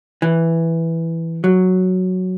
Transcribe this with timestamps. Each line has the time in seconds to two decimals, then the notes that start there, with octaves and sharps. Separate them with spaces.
0.22 E3
1.44 F#3